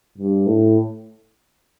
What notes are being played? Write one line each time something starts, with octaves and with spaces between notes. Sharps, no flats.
G2
A2